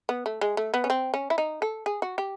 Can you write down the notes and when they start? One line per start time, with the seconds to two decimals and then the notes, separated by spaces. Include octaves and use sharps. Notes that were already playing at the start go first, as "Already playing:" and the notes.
0.09 B3
0.26 A3
0.41 G#3
0.57 A3
0.74 B3
0.84 C#4
0.90 C4
1.14 C#4
1.30 E4
1.38 D#4
1.62 A4
1.86 G#4
2.02 F#4
2.18 G4